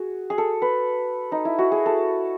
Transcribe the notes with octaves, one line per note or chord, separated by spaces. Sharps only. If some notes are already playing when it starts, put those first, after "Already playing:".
Already playing: F#4 G#4
G#4
A4
B4
D#4
E4
F#4
G#4
A4